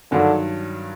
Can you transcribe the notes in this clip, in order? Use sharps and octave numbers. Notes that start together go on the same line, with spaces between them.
G2 D3 D#3 F#3